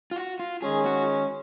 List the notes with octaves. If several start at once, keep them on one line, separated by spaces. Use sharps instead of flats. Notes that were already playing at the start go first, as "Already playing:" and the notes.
F4
F#4
F4
D#3 G#3 C#4 G#4
F#4